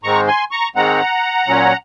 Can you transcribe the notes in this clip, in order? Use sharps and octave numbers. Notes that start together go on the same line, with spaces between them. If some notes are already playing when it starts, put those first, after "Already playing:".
G#2 D#3 G#3 C4 A#5 C#6
G#5 C6
A#5 C#6
G#2 D#3 G#3 C4 F#5 A#5
A#2 F#3 C#4